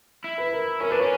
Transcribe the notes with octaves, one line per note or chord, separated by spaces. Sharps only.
E4
B4
A#4
C#4 A#4
D4 B4
C#4 C#5